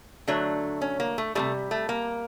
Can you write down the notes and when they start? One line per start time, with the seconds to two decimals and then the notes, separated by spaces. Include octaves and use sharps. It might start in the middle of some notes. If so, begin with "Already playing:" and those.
0.28 D3 F#3 A3 D4
0.81 C#4
1.00 A#3
1.18 A3
1.35 C3 E3 G3 A3
1.71 A3
1.89 A#3